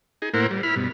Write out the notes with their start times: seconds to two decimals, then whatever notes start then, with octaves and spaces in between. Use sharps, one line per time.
0.22 D#4 G#4
0.34 A2 A#3 E4 A#4 C5 F#5
0.51 G3
0.63 E4 B5 F6
0.76 G2 B2